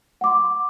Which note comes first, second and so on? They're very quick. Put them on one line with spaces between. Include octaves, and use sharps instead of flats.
F#5 D6 C6